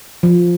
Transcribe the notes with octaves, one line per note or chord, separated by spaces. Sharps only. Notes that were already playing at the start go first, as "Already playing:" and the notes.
F3